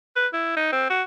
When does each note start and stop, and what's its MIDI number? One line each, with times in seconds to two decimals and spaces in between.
0.16 0.27 71
0.33 0.53 64
0.57 0.71 63
0.72 0.88 60
0.90 1.03 66